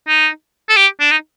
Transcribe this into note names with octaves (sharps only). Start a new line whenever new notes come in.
D#4
A4
G4
D4
D#4